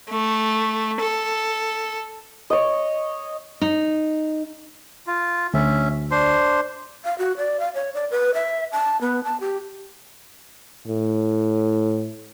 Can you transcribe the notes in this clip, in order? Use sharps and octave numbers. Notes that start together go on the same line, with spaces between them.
A3
A4
C#5 D#5
D#4
F4
D2 C#4 E5
D4 C5 C6
F5
F#4
D5
F5
C#5
D5
B4
E5
A5
B3
A5
G4
A2